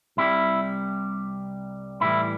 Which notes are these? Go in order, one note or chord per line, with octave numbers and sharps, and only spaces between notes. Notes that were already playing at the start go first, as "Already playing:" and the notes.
C2 C3 G3 E4
A2 E3 G3 E4